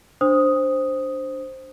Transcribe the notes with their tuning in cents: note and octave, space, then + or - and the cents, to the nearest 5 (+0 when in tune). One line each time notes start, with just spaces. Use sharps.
D4 +0 C5 +0 D#6 +0